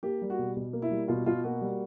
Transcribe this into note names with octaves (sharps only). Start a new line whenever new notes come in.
A#3 G4
G3
F#4
B2
B2
A#3
E4
G3
B2 F4
B2 F4
A#3 F#4
G3